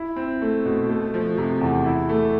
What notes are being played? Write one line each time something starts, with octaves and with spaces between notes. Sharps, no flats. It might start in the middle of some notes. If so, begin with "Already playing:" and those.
Already playing: E4
C4
A3
B2
A3
F3
C3
E2
E4
A3